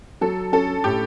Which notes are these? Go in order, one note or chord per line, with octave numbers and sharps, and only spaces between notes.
F#3 A4
C#4 A4
A2 G4